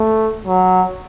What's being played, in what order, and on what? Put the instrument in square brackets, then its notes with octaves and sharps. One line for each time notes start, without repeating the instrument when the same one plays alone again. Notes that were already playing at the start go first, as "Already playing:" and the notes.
Already playing: [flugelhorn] A3
F#3